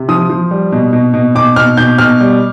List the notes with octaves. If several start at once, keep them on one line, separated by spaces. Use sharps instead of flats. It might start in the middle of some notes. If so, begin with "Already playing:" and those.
Already playing: C3
F3 D#6
F3
G3
B2
B2
B2
B2 D6
B2 F6
B2 G6
B2 F6
G3